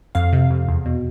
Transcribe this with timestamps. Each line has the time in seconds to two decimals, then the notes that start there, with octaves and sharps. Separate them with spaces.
0.15 F2 F5
0.33 C3
0.50 F2
0.68 E2
0.86 B2